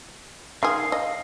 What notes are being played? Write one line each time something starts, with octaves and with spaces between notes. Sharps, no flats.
D#3 G#4 F5 C6 F6
F5
D#5